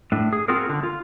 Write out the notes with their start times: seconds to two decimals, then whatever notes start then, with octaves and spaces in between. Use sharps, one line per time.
0.12 A2 D4
0.33 G#4
0.48 C4 F4 F#4 G#4 A#4
0.69 D3
0.83 F4